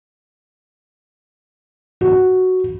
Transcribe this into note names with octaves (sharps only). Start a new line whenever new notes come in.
F#4